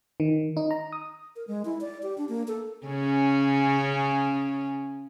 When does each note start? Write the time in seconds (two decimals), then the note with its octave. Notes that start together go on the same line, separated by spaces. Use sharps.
0.20 D#3
0.57 D#4
0.71 A#5
0.92 D#6
1.36 A#4
1.48 G#3
1.65 E4
1.81 D5
2.03 G4
2.18 D4
2.29 A#3
2.48 A4
2.86 C#3 C#4